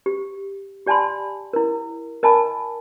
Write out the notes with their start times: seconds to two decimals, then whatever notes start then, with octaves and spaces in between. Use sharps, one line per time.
0.06 G4
0.86 G4 D5 G#5 A5 B5 C6
1.53 E4 A#4
2.23 A#4 D#5 G#5 A5 B5